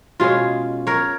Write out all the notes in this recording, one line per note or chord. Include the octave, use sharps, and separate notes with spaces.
B2 G#3 C#4 F4 G#4
A#4 C#5